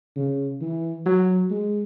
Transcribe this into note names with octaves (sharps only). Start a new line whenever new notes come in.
C#3
E3
F#3
G#3